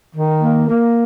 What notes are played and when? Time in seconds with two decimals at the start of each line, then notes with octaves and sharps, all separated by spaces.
0.15 D#3
0.41 A#3
0.68 A#3